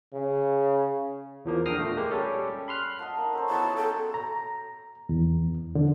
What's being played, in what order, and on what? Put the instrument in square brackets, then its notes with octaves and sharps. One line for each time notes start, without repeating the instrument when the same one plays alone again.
[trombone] C#3
[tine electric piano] E2 F3 A#3
D3 G5 D#6 F6 A#6 C7
A#2 A3
G#3 A#3 G4
G3 C#4 G4 A4
B5 C6 F6 F#6
[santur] D#5 F#5 A5
A#3 D#4
C#4 A4 C5
[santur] B3 E4 G#4 [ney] A5
[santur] F#3
[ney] A4 [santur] G5
[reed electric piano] A#5
E2
D3